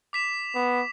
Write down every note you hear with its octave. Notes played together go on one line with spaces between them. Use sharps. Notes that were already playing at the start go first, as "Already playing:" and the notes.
D6 B6 E7
B3